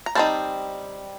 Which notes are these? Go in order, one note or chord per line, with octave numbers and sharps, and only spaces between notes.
A#5
G3 C4 D#4 A5